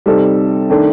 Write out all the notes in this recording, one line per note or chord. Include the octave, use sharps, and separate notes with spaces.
C3 G3 C4 D#4 A4
D#3 A3 D4